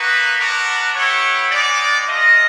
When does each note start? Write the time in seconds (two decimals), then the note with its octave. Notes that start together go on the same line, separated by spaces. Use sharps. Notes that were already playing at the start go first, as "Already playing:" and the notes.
Already playing: A#3 D#4 F#4 B4
0.39 B3 D4 F#4 A#4
0.95 B3 E4 G4 C#5
1.51 G#3 B3 D#4 D5
2.07 A3 D4 F4 D#5